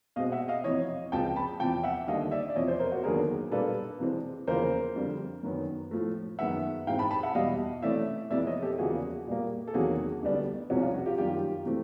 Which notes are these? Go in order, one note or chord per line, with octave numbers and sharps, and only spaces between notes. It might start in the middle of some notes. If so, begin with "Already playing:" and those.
B2 G#3 C4 D#5 F5
E5 F#5
D#5 F5
F2 C3 E3 C#5 D#5
C#2 C3 F3 G#3 G5 A5
A5 B5
E2 C3 F3 G5 A5
E5 F#5
D#2 D3 G3 D#5 F5
D5 E5
D5
E2 C3 F3 C#5 D#5
C5 D5
A#4 C5
F#4
D#2 D3 F#3 B3 G#4 A#4
A#2 G3 A#3 D4 A4 B4
C3 E3 G#3 C4
E2 C#3 F3 A#3 A#4 C5
F2 D3 G3
F#2 D#3 F#3 B3
A2 F3 A3
F#2 D#3 G#3 B3 E5 F#5
G#2 E3 G#3 C4 F5 G5
A5 B5
A5 B5
E5 F#5
E2 B2 G3 D#5 F5
C3 E3 A3 C#4 D5 E5
F2 C3 E3 G#3 B3 D5 E5
C#5 D#5
G4 A4
E2 C#3 F3 A#3 F#4 G#4
A#2 G3 A#3
A4
E2 C3 D#3 F#3 A#3 F#4 G#4
D2 D3 G3 B3 D4
C2 C3 F3 G#3 C#4 F#4
F4
F#4
F4 G4
F#2 D#3 G3 F4 G4
C3 E3 A3 C4